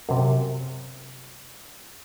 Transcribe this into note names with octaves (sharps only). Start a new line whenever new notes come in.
F#2 C3